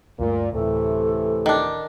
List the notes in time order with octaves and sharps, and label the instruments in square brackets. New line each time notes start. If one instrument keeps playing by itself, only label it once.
[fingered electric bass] D2 G2 A3 [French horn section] A#2
[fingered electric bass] D1 [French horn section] C3 E3 A3 [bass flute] A4
[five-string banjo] D#3 D4